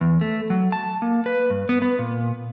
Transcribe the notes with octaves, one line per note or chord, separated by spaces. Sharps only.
E2
A3
F#3
A5
A#3
B4
G2
B3
B3
A#2